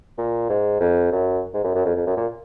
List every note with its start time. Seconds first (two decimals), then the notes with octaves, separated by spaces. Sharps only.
0.18 A#2
0.50 G#2
0.81 F2
1.12 F#2
1.54 G#2
1.64 F#2
1.75 F#2
1.85 F2
1.96 F2
2.07 F#2
2.17 A#2